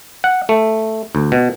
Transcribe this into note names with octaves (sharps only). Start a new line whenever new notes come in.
F#5
A3
D2
B2